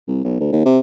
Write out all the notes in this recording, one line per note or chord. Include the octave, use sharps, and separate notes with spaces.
C2
B1
D2
D#2
C3